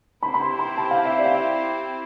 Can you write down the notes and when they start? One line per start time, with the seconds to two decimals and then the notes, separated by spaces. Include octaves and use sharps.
0.23 C4 E4 G4 C5 B5
0.34 B5
0.41 C6
0.59 B5
0.77 A5
0.91 F5
1.05 E5
1.19 D5
1.25 F5
1.32 E5